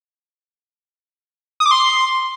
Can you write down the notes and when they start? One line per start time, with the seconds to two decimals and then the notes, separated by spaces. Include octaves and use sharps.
1.60 D#6
1.66 D6
1.71 C6